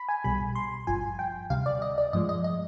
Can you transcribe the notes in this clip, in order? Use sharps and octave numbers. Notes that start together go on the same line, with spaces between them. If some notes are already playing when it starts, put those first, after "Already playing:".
Already playing: B5
G#5
B1 B2 G3 B5
C6
G#1 G2 F3 G#5
G5
D2 C3 G3 F5
D5
D#5
D5
G2 F3 G#3 D#5
D#5
D#5